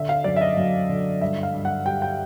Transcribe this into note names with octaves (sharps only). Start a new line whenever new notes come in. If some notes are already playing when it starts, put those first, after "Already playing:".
Already playing: D3 E5
F5
F#2 D5
E5
D#5
F#2
D3
G2 E5
F5
G2
F#5
G3 G5
G5